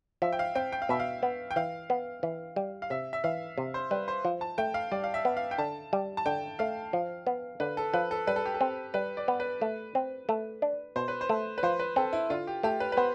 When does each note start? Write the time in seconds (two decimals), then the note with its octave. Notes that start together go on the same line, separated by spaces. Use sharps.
0.22 F3 E5
0.32 G5
0.39 F5
0.55 C4 G5
0.72 G5
0.82 F5
0.89 B2 E5
1.00 F5
1.23 B3
1.51 G5
1.56 E3 F5
1.90 B3
2.23 E3
2.56 G3
2.82 F5
2.90 C3 E5
3.13 E5
3.24 E3 F5
3.58 C3
3.74 C5
3.91 G3 B4
4.08 C5
4.25 F3
4.41 A5
4.58 A3 G5
4.74 F5
4.92 G3 D5
5.04 F5
5.14 E5
5.25 B3
5.37 F5
5.51 G5
5.58 D3 A5
5.93 G3
6.17 A5
6.26 D3 G5
6.59 A3 F5
6.93 F3
7.27 B3
7.60 D3 B4
7.77 A4
7.93 F3 B4
8.11 A4
8.27 G3 B4
8.36 A4
8.45 G4
8.54 A4
8.61 C4
8.94 G3 B4
9.17 D5
9.28 B3
9.40 B4
9.61 A3
9.95 C4
10.29 A3
10.62 D4
10.96 B2 C5
11.08 B4
11.21 C5
11.29 A3
11.58 B4
11.63 F3 C5
11.80 B4
11.96 C4 A4
12.13 E4
12.30 D3 F4
12.47 G4
12.63 A3 G4
12.80 B4
12.92 B4
12.97 B3 C5